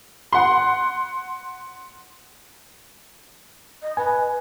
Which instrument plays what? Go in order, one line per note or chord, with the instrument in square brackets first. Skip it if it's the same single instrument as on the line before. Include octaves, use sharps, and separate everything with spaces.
[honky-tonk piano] F#5 C6
[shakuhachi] D#5
[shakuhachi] B4 [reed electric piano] G#5